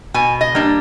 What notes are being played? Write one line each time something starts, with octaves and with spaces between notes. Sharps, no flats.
B2 G#5
D#5
G3 A#3 D4